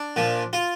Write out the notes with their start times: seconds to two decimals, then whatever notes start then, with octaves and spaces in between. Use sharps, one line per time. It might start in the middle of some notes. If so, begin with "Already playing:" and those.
Already playing: D4
0.16 A#2 F3
0.53 F4